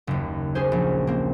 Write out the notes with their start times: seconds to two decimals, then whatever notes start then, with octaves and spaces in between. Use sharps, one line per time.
0.07 F#1 D#2
0.55 C#4 G#4 C5
0.72 A#1
1.07 A#3 C4